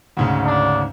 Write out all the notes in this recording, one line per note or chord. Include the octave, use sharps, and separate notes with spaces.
D2 G#2 C#3
D4